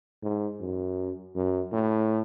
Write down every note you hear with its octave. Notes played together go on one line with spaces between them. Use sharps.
G#2
F#2
F#2
A2